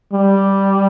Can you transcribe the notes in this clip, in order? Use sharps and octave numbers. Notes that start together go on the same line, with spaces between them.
G3